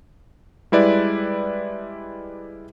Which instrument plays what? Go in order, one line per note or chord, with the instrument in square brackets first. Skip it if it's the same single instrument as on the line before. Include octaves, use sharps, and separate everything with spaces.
[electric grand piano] G3 G#3 E4 B4 D5